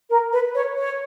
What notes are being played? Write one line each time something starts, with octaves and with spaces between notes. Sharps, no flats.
A#4
B4
C#5
C#5